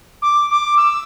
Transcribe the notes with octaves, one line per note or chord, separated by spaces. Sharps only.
D6
D6
E6